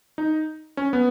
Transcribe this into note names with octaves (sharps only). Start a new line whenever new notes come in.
D#4
C#4
B3